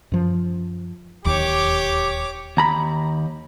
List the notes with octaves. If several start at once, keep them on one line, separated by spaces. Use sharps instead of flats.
F#2 F3
D1 D#2 G4 C#5 D6
D#2 A#5 B5